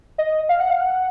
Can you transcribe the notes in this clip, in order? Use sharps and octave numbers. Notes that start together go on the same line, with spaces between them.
D#5
F5
F#5
F5
F#5